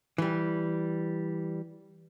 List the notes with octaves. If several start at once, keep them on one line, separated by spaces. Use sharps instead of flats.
E3 G3